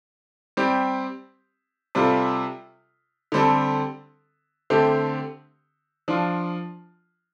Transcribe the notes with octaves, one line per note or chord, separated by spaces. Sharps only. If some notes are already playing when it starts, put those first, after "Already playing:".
G3 C4 G4
C3 G3 F4 A4
D3 G3 C4 A4
D3 A3 C4 G4
F3 D4 F4